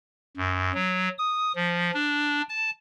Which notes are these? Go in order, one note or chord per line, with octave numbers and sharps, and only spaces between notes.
F#2
F#3
D#6
F3
D4
A5